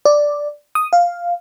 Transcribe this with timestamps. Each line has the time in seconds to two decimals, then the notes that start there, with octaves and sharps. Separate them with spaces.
0.05 D5
0.75 D#6
0.93 F5